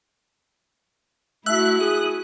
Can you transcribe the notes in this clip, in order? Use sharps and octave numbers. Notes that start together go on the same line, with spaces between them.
A3 E4 F#4 E5 F#6
G#4 D#6